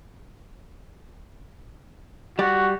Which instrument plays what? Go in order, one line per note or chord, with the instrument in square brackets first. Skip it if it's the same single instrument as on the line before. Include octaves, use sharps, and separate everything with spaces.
[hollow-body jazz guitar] G3 D5 [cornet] F#4